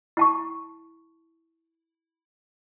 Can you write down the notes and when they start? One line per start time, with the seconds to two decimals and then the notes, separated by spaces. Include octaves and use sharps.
0.17 E4 A5 C#6